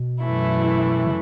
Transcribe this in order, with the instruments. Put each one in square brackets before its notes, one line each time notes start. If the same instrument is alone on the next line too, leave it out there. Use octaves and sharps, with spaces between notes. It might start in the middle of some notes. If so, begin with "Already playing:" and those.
Already playing: [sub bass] B2
[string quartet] F#2 E3 A3 E4
[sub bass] C#3